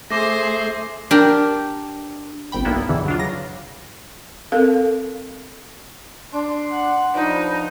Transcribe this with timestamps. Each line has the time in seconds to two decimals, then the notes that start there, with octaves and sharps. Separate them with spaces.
0.11 A3 G#4 C5 C6 D6 A#6
1.11 D4 G4 A#4
2.52 G1 C2 G5 B5
2.65 B1 G2 A#3 B3 E4
2.89 E2 G2 B2 D3 E3
3.06 F#3 D4 F4
3.18 C#3 A#6
4.52 C4 A4 A#4 F5
6.33 D4 C6
6.71 F#5
7.15 F3 D4 D#4 B4